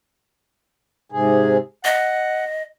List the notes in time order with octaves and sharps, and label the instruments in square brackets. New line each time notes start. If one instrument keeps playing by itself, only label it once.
[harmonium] G#2 C3 G#4
[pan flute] D#5 [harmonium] F#5